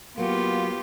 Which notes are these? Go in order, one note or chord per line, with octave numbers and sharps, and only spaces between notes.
F#3 A#3 B3 F4 G4